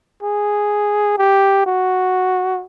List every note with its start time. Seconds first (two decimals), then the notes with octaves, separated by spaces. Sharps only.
0.23 G#4
1.18 G4
1.66 F#4